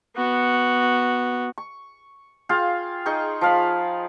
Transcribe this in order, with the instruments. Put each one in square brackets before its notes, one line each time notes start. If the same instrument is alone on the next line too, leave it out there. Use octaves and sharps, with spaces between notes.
[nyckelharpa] B3 F#4
[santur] C#6
F4 G#4 F5 G5
D#4 G#4 G5 C#6
F3 F5 B5